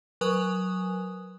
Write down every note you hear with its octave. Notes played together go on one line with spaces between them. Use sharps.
F#3 A#4 B4 G#5 D#6